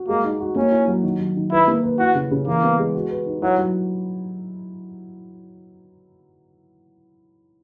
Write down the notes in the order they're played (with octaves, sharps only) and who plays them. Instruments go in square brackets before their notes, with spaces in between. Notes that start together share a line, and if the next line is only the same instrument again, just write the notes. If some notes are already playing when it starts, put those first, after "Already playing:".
Already playing: [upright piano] F#4
[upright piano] G#3 [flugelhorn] A#3
[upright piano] D#4
F#4
[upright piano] A#3 [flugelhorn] C#4
[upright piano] E4
F#3
D#3
F#3
D#3
[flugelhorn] E4 [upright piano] B4
[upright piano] A#3
B4
[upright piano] E4 [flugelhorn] F#4
[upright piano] C#3
C#3
[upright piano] E3 [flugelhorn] A#3
[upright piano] B3
G#3
F#4
B4
D#4
[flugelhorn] F#3 [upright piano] E4
[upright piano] F#3